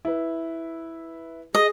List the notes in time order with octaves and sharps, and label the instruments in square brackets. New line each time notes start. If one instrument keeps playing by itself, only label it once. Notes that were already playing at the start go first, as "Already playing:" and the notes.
[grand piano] E4 B4
[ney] G#4 [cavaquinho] D#5